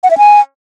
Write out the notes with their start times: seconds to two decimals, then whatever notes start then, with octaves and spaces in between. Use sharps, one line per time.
0.03 F#5
0.11 E5
0.18 G#5